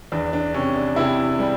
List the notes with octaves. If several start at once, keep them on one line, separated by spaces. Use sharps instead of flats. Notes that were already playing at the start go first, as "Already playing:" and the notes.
E2 D4
D4
C3 C#4
D4
C3 E4
G3